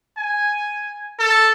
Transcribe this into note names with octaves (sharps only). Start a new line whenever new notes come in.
G#5
A4